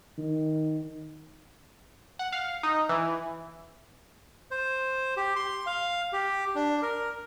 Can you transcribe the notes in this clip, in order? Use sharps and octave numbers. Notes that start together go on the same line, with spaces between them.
D#3
F#5
F5
D#4
E3
C5
G4
C6
F5
G4
D4
A#4